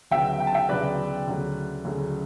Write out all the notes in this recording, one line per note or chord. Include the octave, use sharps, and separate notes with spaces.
D2 C#3 F#3 B3 E5 G5
G5
A5
E5 G5
D2 C#3 F#3 B3 B4 D5
D2 C#3 F#3 A3
D2 C#3 F#3 A3